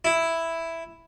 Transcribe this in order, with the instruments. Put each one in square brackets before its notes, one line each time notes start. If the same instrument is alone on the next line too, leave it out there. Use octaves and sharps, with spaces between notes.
[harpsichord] E4